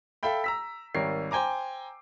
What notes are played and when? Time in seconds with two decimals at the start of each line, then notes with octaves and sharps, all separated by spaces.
0.23 A4 E5 F5 G5 B5
0.44 A#5 E6 B6
0.95 G#1 G3 G4 A#4 C#5 C7
1.31 C5 G5 G#5 A#5 D6